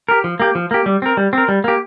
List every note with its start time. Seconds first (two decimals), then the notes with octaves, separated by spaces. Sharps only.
0.09 G4 A#4
0.24 F3
0.40 A#3 G4
0.55 F3
0.71 A#3 G4
0.86 G3
1.02 C4 A#4
1.17 G3
1.33 C4 A#4
1.48 G3
1.64 A#3 G4